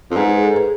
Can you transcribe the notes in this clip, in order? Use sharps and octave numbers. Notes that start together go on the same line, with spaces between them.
F2
G#2 G#4 B4
G#4 B4
A4 C5
G#4 B4